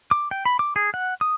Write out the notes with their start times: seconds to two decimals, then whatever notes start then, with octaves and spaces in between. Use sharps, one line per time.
0.11 D6
0.31 G5
0.45 B5
0.59 D6
0.76 G#4
0.94 F#5
1.21 D#6